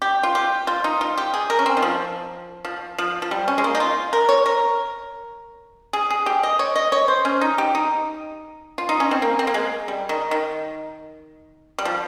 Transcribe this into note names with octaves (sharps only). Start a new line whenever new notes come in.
G4
F4
G4
F4
D#4
F4
G4
G#4
A#4
C#4
C4
D#3
F3
F3
F3
F3
G3
C#4
G#3
A#3
D#4
F4
A#4
C#5
A#4
G#4
G#4
G4
D#5
C#5
D#5
C#5
C5
C#4
D#4
G4
D#4
F4
D#4
C#4
C4
A#3
C4
A#3
G#3
G3
D#3
D#3
G3
F3